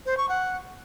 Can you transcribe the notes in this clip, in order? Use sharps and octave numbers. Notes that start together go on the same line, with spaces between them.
C5
C#6
F#5